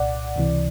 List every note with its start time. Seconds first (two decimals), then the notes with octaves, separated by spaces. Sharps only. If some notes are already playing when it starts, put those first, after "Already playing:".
Already playing: C2 A#2 D5 F#5
0.36 C#2 C3 E3